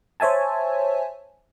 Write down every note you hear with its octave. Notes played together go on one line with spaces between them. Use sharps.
C5 C#5 E5 G#5 A5